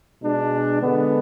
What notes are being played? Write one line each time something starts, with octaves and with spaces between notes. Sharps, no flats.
B2 G#3 D4
D3 G#3 B3